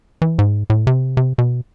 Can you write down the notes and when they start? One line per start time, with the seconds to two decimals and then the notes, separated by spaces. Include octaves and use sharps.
0.22 E3
0.39 G#2
0.70 A2
0.87 C3
1.17 C3
1.38 B2